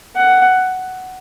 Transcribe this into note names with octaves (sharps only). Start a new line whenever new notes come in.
F#5